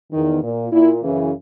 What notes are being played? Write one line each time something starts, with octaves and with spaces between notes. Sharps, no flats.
E2 D#3
A#2
A#2 E4
F#2 C#3 E3